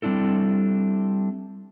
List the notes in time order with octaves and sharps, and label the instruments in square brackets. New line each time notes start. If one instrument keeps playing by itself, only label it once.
[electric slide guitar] G3 C4 D4 E4 A4